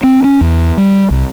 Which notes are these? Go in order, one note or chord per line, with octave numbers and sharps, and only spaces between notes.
C4
C#4
E2
G3
C2